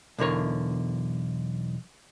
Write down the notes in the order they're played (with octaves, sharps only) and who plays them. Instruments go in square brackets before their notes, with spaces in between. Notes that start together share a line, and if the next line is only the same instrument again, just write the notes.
[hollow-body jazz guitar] B1 E2 D3 A#4 C#5